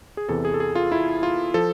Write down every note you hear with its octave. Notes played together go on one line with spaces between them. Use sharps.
G#4
E2 C3 E3 A4
G#4
A4
G#4
F4
E4
F4
F3 A4